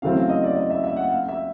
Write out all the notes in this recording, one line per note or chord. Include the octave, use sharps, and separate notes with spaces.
E2 C#3 F#3 A3 C4 F5
F5
D#5
D5
D#5
E5
E5
F#5
F5
E5